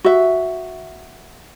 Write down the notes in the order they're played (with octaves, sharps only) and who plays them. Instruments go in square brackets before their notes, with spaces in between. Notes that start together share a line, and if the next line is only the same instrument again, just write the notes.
[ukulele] F#4 E5